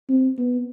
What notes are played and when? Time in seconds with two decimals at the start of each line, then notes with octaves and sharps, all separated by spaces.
0.10 C4
0.38 B3